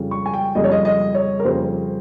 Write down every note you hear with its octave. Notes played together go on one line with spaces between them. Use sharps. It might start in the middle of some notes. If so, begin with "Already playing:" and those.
Already playing: F2 C#3 G3
C#6
G#5
G5
F2 C#3 G3 D#5
C#5
D#5
D#5
C#5
A#4
F2 C#3 G3 C5